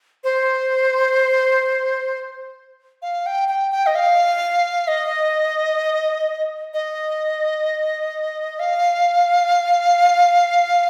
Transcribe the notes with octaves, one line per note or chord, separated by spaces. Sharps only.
C5
F5
G5
G5
G5
D#5
F5
D#5
D#5
F5